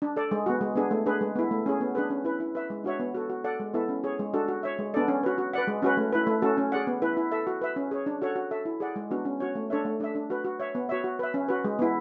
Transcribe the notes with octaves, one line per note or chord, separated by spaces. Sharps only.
D4
A4 D5
G#3
B3 F#4
G#3
B3 D4 G#4
A3
D4 G#4 B4
G#3
B3 E4
A3
C#4 G#4
B3
D4 G#4 B4
C#4
E4 B4
E4
B4 E5
G#3
D4 F#4 C#5 E5
B3
F#4 A4
F#4
A4 D5 F#5
G#3
B3 E4 A4 E5
C#4
G#4 C#5
G#3
D4 F#4 A4
F#4
C#5 E5
G#3
B3 D4 A4 D5
C#4
F#4 B4
F#4
B4 D5 F#5
G#3
C#4 F#4 B4
A3
E4 B4
A3
C#4 F#4 A4
C#4
G#4 D5 F#5
B3
E4 B4
E4
A4 E5
F#4
B4 E5
C#4
G#4 C#5
D4
F#4 A4 C#5 F#5
F#4
A4 E5
E4
G#4 D5 F#5
G#3
B3 D4 F#4
C#4
F#4 C#5
A3
D4 A4 C#5 E5
A3
D4 A4 E5
D4
F#4 B4
F#4
C#5 E5
B3
F#4 C#5 E5
F#4
B4 E5
C#4
F#4 B4
G#3
B3 E4